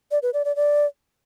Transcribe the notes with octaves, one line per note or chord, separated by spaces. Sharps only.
D5
B4
D5
D5
D5